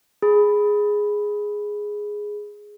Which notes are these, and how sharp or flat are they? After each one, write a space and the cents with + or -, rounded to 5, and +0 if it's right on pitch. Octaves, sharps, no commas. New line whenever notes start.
G#4 +0 B5 +0